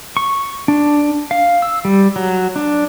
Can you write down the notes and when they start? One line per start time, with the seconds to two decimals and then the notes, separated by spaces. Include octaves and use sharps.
0.17 C#6
0.68 D4
1.31 F5
1.62 E6
1.85 G3
2.16 F#3
2.56 D4